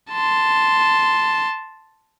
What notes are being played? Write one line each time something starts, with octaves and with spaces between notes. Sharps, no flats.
A5 C6